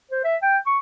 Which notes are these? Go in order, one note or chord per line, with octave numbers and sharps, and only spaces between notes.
C5
E5
G5
C#6